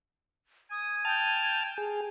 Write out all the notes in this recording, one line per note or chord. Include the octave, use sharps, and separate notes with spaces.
G#5 D#6
G5 A5 F6
G#4